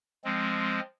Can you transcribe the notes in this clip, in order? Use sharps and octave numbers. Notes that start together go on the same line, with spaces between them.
F3 G#3 C4